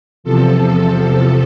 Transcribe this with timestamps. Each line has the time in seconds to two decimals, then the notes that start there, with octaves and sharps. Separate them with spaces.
0.24 E2 C3 F3 A4